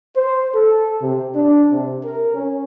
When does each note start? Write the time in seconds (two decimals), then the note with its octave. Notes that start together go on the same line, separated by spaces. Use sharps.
0.14 C5
0.53 A4
1.01 C3
1.34 D4
1.71 C3
2.03 A#4
2.34 C#4